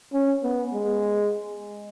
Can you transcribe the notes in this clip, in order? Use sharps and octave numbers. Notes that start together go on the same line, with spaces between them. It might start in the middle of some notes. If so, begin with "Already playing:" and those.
C#4
B3
G#3